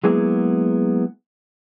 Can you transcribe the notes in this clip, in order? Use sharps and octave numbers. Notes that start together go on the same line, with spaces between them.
F#3 G#3 A#3 B3 E4 G#4